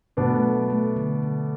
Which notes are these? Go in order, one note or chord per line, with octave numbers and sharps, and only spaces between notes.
B2 A3 B3 D4
A3
F#3
A3
D3
D3